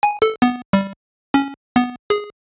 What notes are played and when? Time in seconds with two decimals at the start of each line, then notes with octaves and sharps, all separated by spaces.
0.03 G#5
0.22 A4
0.42 B3
0.73 G3
1.34 C#4
1.76 B3
2.10 G#4